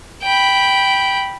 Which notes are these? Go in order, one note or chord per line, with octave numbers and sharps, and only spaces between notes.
G5 B5